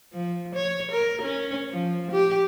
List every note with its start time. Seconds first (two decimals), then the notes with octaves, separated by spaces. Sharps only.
0.14 F3
0.56 C#5
0.92 A#4
1.23 C#4
1.70 F3
2.12 G4